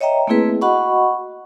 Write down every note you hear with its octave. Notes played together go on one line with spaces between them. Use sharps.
C#5 D#5 E5 G5 A#5
A3 A#3 C4 E4 G#4 B4
F#4 D#5 F#5 B5 C#6